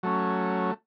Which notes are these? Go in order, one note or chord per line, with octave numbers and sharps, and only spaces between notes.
F#3 A3 C#4